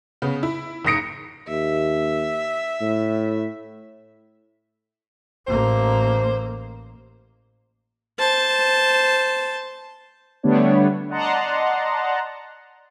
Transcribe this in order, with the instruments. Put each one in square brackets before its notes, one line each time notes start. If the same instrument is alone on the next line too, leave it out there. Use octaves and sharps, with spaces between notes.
[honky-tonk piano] C#3 B3
E4
F#1 G#2 D#6 A#6 C#7 D7
[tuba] D#2 [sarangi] E5
[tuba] A2
[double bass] A1 A#3 [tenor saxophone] C5
[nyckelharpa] C5 A5
[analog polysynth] D3 G3 A3 B3 D4 C#5
D5 D#5 F#5 A5 A#5 C6